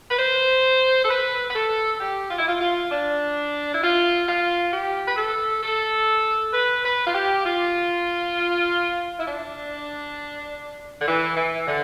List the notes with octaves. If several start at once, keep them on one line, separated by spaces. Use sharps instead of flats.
B4
C5
A4
B4
B4
A4
G4
F4
E4
F4
F4
D4
E4
F4
F4
G4
B4
A4
A4
B4
B4
F4
G4
F4
E4
D4
D3
E3
E3
D3